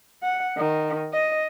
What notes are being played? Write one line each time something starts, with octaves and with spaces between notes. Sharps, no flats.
F#5
D#3
D#5